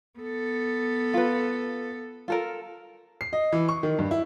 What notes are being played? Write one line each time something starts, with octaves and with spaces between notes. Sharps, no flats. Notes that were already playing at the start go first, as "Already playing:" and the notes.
B3 A4
F4 B4
F4 A4 A#4
C7
D#5
E3
C#6
D#3
G2
E4